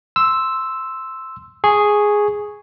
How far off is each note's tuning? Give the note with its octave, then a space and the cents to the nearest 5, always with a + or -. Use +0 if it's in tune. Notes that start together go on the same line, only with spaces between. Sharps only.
C6 +0 E6 +0
G#4 +0 C#6 +0